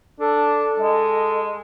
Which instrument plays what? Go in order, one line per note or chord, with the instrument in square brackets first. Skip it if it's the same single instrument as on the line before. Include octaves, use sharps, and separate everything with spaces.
[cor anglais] D4 [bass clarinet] A4
[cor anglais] G#3 [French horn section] D#5